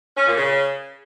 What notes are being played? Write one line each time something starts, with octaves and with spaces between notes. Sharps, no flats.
C#4
A#2
C#3